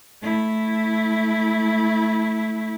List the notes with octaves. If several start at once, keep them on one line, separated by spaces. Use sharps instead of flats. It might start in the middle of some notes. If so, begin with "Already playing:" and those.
A3 E4